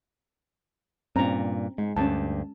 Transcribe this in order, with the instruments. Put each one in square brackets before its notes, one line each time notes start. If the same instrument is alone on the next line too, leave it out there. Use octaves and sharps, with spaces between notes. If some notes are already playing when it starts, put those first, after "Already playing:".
[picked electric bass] G2 A#2 [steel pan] C4 C#4 A#5
[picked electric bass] G#2 [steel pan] G#3
[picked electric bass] D2 G2 [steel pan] C#4 A5